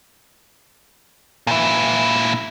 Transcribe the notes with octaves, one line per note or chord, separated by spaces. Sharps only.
A#2 E4